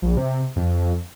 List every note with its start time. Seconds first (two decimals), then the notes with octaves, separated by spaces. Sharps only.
0.02 A#1
0.17 C3
0.56 F2